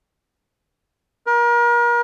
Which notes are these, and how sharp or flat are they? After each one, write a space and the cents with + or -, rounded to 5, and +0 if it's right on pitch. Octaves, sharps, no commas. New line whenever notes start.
A#4 +35